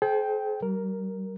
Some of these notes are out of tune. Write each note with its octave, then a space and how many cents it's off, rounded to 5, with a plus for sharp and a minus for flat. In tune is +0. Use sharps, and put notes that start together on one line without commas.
G#4 +45 C5 +0 G5 +0
G3 -40 A#4 +0